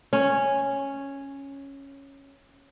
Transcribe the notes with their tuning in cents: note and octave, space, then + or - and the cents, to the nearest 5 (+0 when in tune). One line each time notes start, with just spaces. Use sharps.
C#4 -5